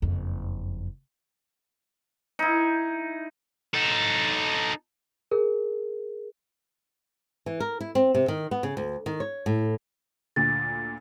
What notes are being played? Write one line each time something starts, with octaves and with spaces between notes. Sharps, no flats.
F#1 F2
D#4 E4
D#4 A4
G#4 A#4
E3
A#4
E4
C4
C3
D#3
B3
C#3
D2
D#3
C#5
A2
D2 A#2 D3 A6